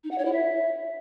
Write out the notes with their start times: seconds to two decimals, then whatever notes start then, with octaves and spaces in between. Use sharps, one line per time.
0.04 D#4
0.11 F#5
0.18 C#5
0.25 E4
0.32 E5